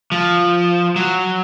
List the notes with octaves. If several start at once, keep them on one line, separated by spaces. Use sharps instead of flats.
F3
F#3